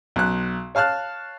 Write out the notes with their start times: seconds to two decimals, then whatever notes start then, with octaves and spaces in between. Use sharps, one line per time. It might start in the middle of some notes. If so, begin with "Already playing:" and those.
0.16 B1 F#6
0.75 C#5 F5 A5 F6 F#6